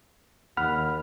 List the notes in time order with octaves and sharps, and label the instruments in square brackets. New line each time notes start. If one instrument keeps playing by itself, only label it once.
[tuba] D#2 [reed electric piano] F#5 B5 F6